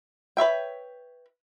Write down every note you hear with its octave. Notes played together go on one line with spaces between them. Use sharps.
B4 C#5 E5 G5